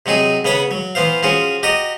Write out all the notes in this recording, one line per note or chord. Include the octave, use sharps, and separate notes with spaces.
C3 F#3 D#4 G#4
C#3 B3 C#5 F#5 B5
F#3
E3 B3 C5 F5
F3 C#4 F#4 G#4
F#4 G4 D#5 A#5